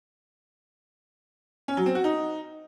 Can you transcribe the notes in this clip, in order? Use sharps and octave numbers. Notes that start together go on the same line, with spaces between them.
C#4
F#3
C4
F#4
D#4